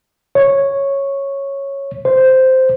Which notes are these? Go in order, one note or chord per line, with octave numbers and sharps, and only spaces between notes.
C#5
C5